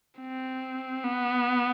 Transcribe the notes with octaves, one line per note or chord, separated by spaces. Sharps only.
C4
B3